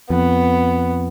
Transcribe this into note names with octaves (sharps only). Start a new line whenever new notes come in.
F2 B3